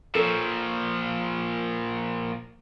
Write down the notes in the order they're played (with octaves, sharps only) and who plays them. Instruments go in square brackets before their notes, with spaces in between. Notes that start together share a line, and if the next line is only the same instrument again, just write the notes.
[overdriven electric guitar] A#2 F3 [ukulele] A4 C#5